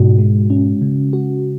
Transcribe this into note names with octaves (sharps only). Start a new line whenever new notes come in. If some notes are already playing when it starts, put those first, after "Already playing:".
Already playing: G#2 B2 F#4
G#3
C#4
C#3
F#4